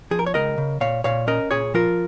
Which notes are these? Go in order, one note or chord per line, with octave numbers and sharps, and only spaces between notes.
F3 G#4
A#4
C#5
C#2 A#4 D#5
C#3
A#2 C#5 F5
A#2 C#5 F5
C#4 A#4 D#5
A#2 G#4 C#5
F3 F4 A#4